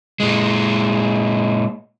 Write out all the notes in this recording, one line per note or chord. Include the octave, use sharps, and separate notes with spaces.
A#2 G#3